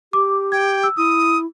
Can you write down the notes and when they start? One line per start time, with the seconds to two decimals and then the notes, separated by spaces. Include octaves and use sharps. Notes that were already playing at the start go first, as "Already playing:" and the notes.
0.13 G4 D6
0.52 G5 G#6
0.83 E6
0.97 E4 D#6